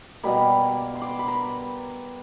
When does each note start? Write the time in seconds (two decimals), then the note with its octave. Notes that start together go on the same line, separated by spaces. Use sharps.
0.23 B2 G3 A#3 B5
0.94 C6
1.02 D6
1.11 C6
1.19 B5
1.28 A#5